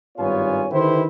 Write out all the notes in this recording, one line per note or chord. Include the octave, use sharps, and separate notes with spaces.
G#1 G2 B3 F4 C#5 G#5
D3 D#3 E4 G4 B4 C5